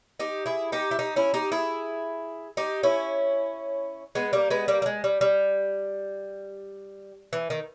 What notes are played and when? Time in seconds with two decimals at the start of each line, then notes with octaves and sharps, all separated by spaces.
0.20 D#4 G4
0.46 E4 G#4
0.72 D#4 G4
0.91 E4
0.99 D#4 G4
1.16 C#4 E4
1.34 D#4 G4
1.52 E4 G#4
2.57 D#4 G4
2.83 C#4 E4
4.15 G#3 B3
4.33 G3 A#3
4.50 G#3 B3
4.68 G3 A#3
4.82 G3
4.86 G#3
5.04 G3
5.21 G3
7.33 E3
7.50 D#3